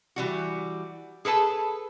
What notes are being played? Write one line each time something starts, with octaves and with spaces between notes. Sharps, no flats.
E3 G3 F#4
G#4 A4 B4 A5